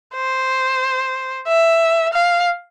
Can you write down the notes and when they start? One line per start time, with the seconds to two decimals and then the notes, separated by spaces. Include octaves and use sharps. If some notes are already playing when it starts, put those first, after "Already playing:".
0.15 C5
1.48 E5
2.13 F5